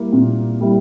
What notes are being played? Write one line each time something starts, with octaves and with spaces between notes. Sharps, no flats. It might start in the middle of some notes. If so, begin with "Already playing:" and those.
Already playing: G3 A#3 E4
A#2
G3 A#3 E4